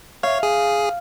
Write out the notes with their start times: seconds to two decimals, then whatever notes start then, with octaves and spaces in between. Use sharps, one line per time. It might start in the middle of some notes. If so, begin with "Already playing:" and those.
0.23 C#5 F5
0.43 G#4